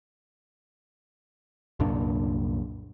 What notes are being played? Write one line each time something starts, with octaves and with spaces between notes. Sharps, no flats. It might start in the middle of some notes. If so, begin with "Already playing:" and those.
C2 F#2 A#2 D4